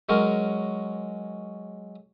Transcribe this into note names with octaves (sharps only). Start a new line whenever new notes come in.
F#3 G#3 C#4 A#4